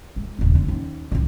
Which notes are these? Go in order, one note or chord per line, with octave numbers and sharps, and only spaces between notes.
G#3
D#1 C#2
D3
D#2 C#4
C2 D#3